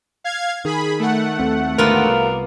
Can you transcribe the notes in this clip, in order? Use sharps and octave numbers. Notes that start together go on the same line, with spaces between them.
F5 G#6
D#3 G#4 B5
A3 F#5
D#2 C4
D#2 G#2 D3 A#3 B3 F4 A#4
C2